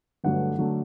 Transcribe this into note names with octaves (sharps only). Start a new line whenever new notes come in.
G1 G2 D3 F#3 A3 F#5
D3 F#3 A3